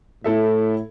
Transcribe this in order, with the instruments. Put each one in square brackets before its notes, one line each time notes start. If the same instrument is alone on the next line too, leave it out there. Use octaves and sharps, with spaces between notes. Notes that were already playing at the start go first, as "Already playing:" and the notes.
[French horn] A2 [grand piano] E4 A4 E5